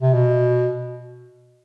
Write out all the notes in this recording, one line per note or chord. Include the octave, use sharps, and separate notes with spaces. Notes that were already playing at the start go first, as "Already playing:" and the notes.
C3
B2